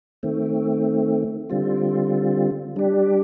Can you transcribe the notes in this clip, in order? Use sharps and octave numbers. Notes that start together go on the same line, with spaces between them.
D#3 A3 C4
D3 G3 C4 F4
G3 D4 G4